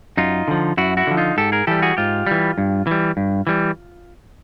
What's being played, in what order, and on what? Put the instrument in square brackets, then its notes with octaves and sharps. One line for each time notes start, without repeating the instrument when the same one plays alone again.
[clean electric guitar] F#2 D#4 F4
D3 F3
F#2 E4 F#4
E4 F#4
D3 F3
D#4 F4
G#2 G4 A4
G#4 A#4
E3 G3 G4 A4
F#4 G#4
G#2 F4 G4
E3 G3
G2
E3 G3
G2
E3 G3